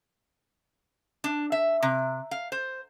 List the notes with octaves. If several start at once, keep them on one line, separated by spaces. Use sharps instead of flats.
D4
E5
C3
F5
C5